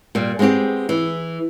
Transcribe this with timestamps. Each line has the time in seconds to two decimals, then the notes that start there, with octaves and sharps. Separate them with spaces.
0.15 A#2 G3
0.39 G#3 B3 C4 F#4 G4
0.89 E3